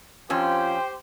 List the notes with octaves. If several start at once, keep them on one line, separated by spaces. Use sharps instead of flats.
F2 C#4 F4 G4 C5 G5